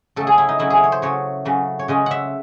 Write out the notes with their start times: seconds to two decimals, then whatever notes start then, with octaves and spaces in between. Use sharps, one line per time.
0.16 C#3 F#3 A3 A4
0.27 G#4
0.38 E4
0.49 D#4
0.59 C#3 F#3 A3 E4
0.70 G#4
0.84 C#5
0.92 C5
1.02 C#3 F#3 A3 C#5
1.45 C#3 F#3 A3
1.79 C#5
1.88 C#3 G#3 C#4 D#5
2.06 E5 F#5